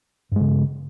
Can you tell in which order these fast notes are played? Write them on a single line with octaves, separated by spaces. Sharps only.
G2 G#3 C#3